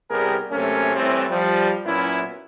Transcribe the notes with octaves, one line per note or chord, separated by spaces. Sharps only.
C2 G3 B3 G4 G#4 A#4
F#2 C3 A3 A#3 C#4
A2 E3 G3 C4
F3 G3
A#2 F#3 B3 C#4 E4